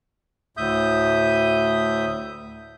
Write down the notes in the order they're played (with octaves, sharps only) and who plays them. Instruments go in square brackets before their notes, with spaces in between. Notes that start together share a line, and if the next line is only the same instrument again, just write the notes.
[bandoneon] D2 A2 E5 D#6 G6